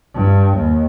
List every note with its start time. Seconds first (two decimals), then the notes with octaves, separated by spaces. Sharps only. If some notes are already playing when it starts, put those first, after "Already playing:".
0.14 G2
0.57 D#2